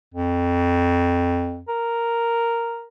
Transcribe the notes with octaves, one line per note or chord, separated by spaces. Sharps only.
F2
A#4